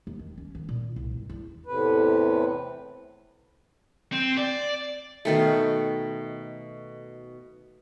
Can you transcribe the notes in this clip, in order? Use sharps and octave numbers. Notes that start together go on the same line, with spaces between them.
D#2
D#3
C#4
D#3
A#2
C2
G1
E2
E2 A2 C3 B4
C4
D5
B2 D#3 A3